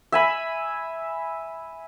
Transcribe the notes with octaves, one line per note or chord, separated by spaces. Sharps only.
E5 G#5 B5